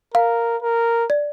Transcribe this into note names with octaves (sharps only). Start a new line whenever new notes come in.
A#4 F5
A#4
D5